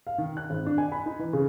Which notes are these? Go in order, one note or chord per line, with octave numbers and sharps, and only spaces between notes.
F5
D#3
F#6
G#1
D4
G#5
B5
D#4
E3
C#3